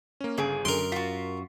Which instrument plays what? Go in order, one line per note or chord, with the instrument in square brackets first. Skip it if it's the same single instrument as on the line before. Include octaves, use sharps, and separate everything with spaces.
[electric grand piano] A#3 C#4
[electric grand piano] G1 D7 [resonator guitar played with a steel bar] C#3 G#4
[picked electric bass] F#2 [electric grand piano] D3 D7 [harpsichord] A#4 C6
[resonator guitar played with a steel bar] F4 F#4 [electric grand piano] B6